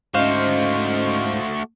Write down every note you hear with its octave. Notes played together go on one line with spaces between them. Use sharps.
G#2 A3 C#4 F#4 C5 D#5 F5